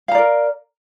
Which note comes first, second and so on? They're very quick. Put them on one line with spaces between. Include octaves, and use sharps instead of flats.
F5 A#5 D5 A#4